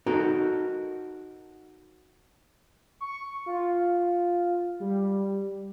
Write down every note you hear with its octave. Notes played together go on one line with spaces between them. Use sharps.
D#4 F#4 A4 A#4
C#6
F4
G3